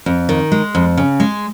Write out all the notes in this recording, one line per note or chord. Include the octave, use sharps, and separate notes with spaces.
F2
D#3
G#3
F2
C#3
G#3